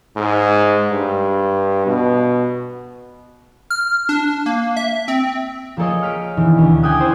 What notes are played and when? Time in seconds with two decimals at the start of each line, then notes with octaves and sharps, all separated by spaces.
0.16 G#2
0.92 G2
1.87 B2
3.70 F6
4.09 D4
4.46 A#3
4.77 E5
5.08 C4
5.77 F3 A#3 G#4 A4 C#5 D#5
6.02 F6 B6 D7
6.37 B2 D#3 E3
6.57 D2 C#4
6.83 G5 G#5 D6 D#6 F#6
7.00 C#4 E4 C5